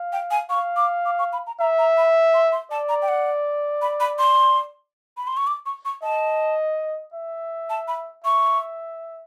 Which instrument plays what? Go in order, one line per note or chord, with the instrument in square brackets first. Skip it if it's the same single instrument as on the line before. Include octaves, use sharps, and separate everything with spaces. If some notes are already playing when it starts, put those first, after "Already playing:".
Already playing: [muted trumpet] F5
[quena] G5
G#5
[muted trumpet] F5 [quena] C#6
[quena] D6
D6
C#6
B5
A#5
[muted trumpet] E5 [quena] A#5
[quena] A#5
B5
C6
C6
[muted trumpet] D5 [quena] A5
[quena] A#5
G5
F#5
B5
B5
C6
B5
C6
C#6
D6
C#6
C#6
[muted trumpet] D#5 [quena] A5
[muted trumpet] E5
[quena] A5
B5
[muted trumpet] E5 [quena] C#6